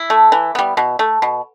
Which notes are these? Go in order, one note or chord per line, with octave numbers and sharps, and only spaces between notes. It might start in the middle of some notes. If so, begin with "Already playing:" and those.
Already playing: E4
A3
E3
G3 B3
B2
A3
B2